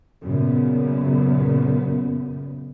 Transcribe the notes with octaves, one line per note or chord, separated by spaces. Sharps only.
F#2 A#2 C#3 B3